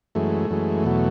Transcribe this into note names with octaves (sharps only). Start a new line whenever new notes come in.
F#2 E3 G#3 A3
F#2 E3 G#3
E2 B2 F#3